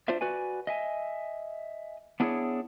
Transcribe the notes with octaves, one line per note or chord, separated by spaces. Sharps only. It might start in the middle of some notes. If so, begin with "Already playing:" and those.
D4 F4 C5 D5 E5
F#4 B4 D5 G#5
D#5 E5 G#5
B3 D4 E4 G#4 A4 C#5